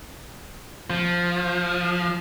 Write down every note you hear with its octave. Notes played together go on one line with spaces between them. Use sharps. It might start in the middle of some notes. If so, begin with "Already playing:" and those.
F3